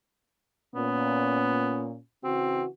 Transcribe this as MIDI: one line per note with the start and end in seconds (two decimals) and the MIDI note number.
0.75 1.95 46
0.75 1.88 59
0.75 1.99 61
2.24 2.68 49
2.24 2.68 52
2.24 2.63 60
2.24 2.68 66